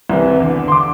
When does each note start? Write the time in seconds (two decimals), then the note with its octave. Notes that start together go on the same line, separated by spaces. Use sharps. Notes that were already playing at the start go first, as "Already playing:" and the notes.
0.10 C2 C3 E3
0.40 E2 D3
0.68 C6
0.72 D3 D6